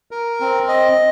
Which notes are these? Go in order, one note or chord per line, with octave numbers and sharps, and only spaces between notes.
A#4
C4
D#5